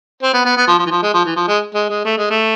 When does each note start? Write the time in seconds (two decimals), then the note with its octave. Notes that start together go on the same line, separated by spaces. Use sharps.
0.22 C4
0.33 B3
0.45 B3
0.56 B3
0.67 F3
0.79 F3
0.86 E3
0.91 F3
1.02 G#3
1.14 F3
1.25 E3
1.36 F3
1.48 G#3
1.74 G#3
1.89 G#3
2.05 A3
2.17 G#3
2.30 A3